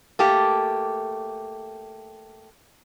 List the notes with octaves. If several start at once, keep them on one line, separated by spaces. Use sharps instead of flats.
A3 A#3 G4